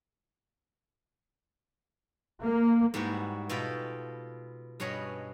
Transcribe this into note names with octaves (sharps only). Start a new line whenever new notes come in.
A#3
G#2 G3 B3 E4 F#4
B2 F4 A4 G5 B5
G2 B2 C#4 C#5 D#5 B5